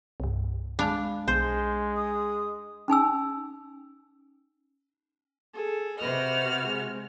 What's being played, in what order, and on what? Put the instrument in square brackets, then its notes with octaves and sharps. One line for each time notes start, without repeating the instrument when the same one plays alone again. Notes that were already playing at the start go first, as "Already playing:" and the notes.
[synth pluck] C2 G2
[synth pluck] G#3 F5 B5 [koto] D4
[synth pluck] B1 [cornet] G#3 [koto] C5
[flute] D#6
[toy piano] C#4 D#4 G#5 E6
[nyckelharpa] G#4 A4
[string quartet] C3 F#4 F6 [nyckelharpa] B4 D#5
[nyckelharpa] B4
G#3